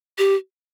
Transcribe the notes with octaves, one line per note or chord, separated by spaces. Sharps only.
G4